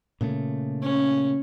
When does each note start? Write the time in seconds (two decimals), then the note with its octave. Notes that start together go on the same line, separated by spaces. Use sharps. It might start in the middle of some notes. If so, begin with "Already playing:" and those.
0.21 A#2 C#3 A3
0.82 C#4